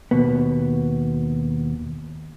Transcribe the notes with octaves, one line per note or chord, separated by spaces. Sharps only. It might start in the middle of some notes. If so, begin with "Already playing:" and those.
D#2 B2 B3